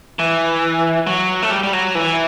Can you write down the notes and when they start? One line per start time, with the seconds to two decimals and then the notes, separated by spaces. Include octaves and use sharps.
0.19 E3
1.07 F#3
1.42 A3
1.51 G3
1.63 G3
1.73 F#3
1.95 E3